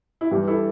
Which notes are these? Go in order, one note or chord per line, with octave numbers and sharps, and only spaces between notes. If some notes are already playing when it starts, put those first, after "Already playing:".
E4
G2 E3 G3 G4
E4 A4